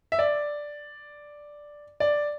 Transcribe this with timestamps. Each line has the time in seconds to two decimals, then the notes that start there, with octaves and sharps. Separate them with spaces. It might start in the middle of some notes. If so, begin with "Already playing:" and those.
0.12 E5
0.19 D5
2.00 D5